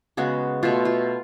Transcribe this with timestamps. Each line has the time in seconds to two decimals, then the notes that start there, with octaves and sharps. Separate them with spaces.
0.17 C#3 G#3 B3 F#4
0.63 B2 A3 F4
0.85 F4